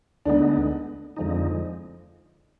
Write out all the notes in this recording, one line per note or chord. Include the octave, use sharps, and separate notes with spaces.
D2 D3 G#3 B3 D4 D#4
F2 D3 F3 G#3 D#4